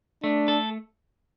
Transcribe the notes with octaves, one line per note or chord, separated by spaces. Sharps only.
A3 D4
A4